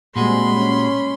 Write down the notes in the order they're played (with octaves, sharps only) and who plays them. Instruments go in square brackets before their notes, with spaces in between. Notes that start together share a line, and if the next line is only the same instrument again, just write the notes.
[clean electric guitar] A#2 F#4 G#4 [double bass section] G3 G#3 C4 [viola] B5 C6
[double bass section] C#4